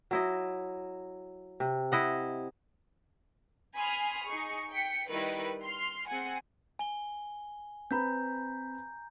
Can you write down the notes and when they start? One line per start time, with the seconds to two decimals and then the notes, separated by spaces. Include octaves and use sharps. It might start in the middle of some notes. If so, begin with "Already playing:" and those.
0.11 F#3 E4 D#5
1.60 C3
1.92 E4 D#5 F#5
3.76 G#5 B5 C6 D#6 F6
4.25 D#4 G#4 C#6
4.71 G5 B6 C#7
5.09 D#3 G3 E4 A#4 B4
5.61 C6 F6
6.08 C4 G#4 F#5 G#5
6.79 G#5 G7
7.91 C4 B4 A#5 B5 G6